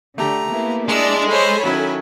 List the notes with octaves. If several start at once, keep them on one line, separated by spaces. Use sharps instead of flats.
D3 A3 G4 A#5
A#3 B3 E4
G#3 D4 E4 D5 E6
A4 C5 C#5 G#5 B5
D#3 F#3 C#4 E4